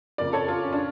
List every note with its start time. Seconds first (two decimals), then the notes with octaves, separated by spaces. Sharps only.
0.18 F2 C#3 F3 A#3 A#4 D5
0.33 A4 C#5
0.48 F4 A4
0.63 C#4
0.73 D4